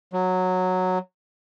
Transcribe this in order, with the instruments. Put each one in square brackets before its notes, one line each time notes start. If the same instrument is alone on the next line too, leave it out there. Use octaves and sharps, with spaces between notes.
[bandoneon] F#3